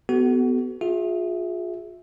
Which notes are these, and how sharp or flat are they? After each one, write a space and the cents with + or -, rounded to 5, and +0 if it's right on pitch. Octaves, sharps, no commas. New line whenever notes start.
B3 +15 F#4 +30 A4 -25
F4 +35 G#4 +0 E5 +0